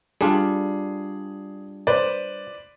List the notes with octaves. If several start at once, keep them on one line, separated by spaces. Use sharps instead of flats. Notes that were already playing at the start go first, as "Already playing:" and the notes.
G3 D4 F4 G#4
B4 C5 D5